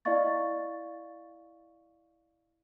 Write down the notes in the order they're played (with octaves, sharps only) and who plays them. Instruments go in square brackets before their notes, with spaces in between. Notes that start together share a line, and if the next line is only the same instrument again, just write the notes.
[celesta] E4 D5 D#5 F5 C#6 A6